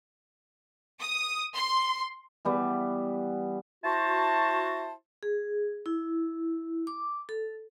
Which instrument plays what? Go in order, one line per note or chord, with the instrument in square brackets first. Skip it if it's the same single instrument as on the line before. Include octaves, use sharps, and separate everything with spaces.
[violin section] D#6
C6
[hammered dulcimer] E3 G3 B3
[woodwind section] E4 F#4 C5 A5
[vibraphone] G#4
E4
D6
A4